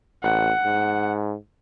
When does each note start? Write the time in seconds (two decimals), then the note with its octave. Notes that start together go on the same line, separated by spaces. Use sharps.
0.23 A1 F#5
0.65 G#2